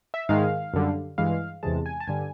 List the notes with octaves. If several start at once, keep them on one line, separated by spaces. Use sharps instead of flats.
E5
G#2 D#3 G#3 F5
F#2 D3 G3
G2 E3 G#3 F5
E2 C3 E3 G#3 A5
G#5
A5
G2 D3 G3 G#5